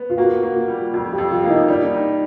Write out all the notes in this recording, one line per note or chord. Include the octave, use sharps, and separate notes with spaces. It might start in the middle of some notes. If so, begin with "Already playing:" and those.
Already playing: B3
F4
A#3 F#4
A#3
F4
G3
F2 F4
G4
F2
F4
A#3
D#4
G3 D4
D#4